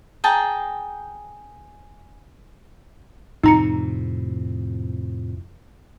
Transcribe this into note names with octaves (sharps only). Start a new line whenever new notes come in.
G#4 G5 A5 A#5
F2 A2 C3 D#4 A#5 C#7